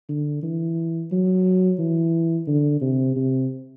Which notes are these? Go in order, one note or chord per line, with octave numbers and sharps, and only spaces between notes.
D3
E3
F#3
E3
D3
C3
C3